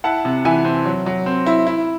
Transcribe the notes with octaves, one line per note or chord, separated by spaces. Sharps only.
E4 F#5 A5
C3
E3 E5 G#5
C4
F#3
F#3
C4
E4
E4